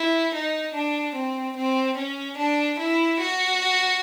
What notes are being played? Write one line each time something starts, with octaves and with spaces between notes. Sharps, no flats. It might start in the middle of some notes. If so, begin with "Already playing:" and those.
Already playing: E4
D#4
D4
C4
C4
C#4
D4
E4
F#4